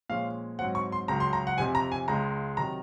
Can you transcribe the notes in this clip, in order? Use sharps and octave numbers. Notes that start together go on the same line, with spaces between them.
A#2 F3 G#3 C#4 F5
G#2 F#3 C4 F#5
C#6
C6
C#2 C#3 F#3 A#5
C6
A#5
F#5
F2 C3 F3 G#5
A#5
G#5
C#2 C#3 G#3 A#5
C3 D#3 F#3 A#5